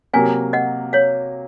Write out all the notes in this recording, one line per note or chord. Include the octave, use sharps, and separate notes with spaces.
C3 F#3 A#3 F5 G#5
D#5 F#5
C#5 F5